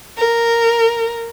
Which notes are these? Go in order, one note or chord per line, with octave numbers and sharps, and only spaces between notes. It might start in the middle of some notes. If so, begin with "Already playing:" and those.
A#4